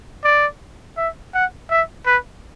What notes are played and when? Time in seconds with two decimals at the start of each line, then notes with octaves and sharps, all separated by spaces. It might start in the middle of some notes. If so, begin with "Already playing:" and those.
0.25 D5
0.97 E5
1.34 F#5
1.71 E5
2.06 B4